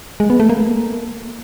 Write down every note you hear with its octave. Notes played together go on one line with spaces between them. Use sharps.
G#3
B3
A3
A#3